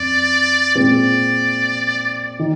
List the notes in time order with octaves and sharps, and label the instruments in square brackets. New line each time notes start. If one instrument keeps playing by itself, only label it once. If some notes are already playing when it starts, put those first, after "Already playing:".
Already playing: [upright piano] F2 [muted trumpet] D5
[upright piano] A#2 G#3 C4 [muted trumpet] D5
[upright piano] D#3